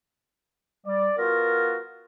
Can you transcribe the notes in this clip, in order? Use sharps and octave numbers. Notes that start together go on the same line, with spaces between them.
G3 D5
B3 F4 F#4 A#4